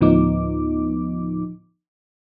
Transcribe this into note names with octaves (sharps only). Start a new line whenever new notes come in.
D2 A2 F3 B3 D#4 D6